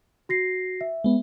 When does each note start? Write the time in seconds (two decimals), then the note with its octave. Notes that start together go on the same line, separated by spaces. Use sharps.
0.29 F#4 A#6 C7
0.81 E5
1.04 G#3 B3